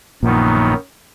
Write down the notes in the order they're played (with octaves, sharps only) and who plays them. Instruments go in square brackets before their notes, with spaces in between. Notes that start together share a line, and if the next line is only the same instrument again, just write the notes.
[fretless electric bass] A#1 A#2 [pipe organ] F#2 D#3 F#3 B3 D#4